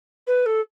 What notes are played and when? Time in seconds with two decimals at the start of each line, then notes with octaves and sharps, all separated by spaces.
0.27 B4
0.46 A4